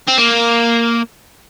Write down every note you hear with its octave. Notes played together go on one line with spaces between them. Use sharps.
C4
A#3